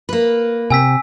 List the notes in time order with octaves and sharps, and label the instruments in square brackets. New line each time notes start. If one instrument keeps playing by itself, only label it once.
[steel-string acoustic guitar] A#3 B4
[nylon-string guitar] C3 G5 [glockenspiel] G#5 E6 B6